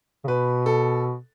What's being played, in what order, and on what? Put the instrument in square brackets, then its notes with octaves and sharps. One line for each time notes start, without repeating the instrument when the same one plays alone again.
[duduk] C#3
[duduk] B2 [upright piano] B4
[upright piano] A4